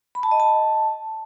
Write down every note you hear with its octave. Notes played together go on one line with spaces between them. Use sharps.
B5
A5
D#5
A5